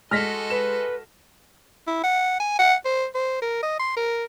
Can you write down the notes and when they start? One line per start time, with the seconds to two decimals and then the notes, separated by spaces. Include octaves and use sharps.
0.11 G#3 F#4 A4 D#5 F6 A#6 B6
0.50 B4 E7
1.87 E4
2.04 F#5
2.40 G#5
2.59 F#5
2.85 C5
3.15 C5
3.42 A#4
3.63 D#5
3.79 C6
3.97 A#4